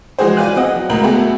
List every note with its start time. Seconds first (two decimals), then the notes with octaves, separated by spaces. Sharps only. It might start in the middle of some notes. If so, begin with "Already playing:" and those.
0.19 E3 F3 G#3 F#4 G#4 C5
0.37 B4 D5 F5 G#5 F#6
0.56 C4 D#5 F#5
0.76 F#3
0.90 C#2 A2 A#4 B5 F#7
1.03 A3 B3 F#4 G#4 A4